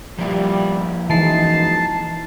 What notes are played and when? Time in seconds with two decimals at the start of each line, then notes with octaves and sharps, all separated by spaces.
0.19 F3 G3 A#3 E4
1.10 F#2 E3 G#3 D#4 A5 C7